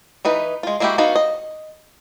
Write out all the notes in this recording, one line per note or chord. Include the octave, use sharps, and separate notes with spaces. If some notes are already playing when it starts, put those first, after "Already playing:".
E3 D#4 B4
G#3 F4
G#3 A#3 E4 F#4 G4
B3 D#4 F#4 F5
D#5